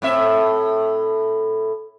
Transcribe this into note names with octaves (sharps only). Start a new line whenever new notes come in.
A2 C4 E5